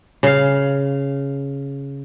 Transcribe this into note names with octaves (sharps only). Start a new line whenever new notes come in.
C#3 F5